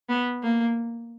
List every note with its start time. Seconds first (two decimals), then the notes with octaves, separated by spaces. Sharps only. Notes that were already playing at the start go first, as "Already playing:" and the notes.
0.09 B3
0.43 A#3